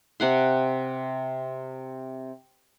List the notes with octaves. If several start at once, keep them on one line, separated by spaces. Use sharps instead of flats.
C3 F#5 C6